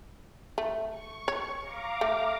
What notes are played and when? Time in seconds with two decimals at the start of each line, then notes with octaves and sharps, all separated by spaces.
0.58 A3
0.89 C#6
1.28 C#5
1.62 F5 A#5 D6
2.01 A3